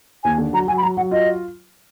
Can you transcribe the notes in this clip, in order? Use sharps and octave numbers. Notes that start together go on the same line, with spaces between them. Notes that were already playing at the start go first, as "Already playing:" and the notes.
D#2 G#5
D3
F#3 A#5
F#3 G#5
B5
F#3 A#5
F#3 F#5
F4 D#5